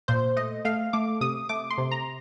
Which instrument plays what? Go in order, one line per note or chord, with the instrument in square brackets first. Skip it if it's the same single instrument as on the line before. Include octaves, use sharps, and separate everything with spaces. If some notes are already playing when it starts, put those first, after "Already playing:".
[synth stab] A#2 C5
A3 D#5
A3 F5
A3 D6
C3 D#6
A3 D6
C6
C3
A#5